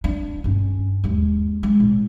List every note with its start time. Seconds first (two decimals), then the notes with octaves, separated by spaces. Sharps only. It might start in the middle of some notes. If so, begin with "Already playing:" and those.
0.04 D4
0.44 G2 C#4
1.04 D#2 G#3
1.63 G#3
1.80 A2